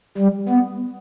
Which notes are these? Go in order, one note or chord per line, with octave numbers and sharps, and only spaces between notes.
G3
B3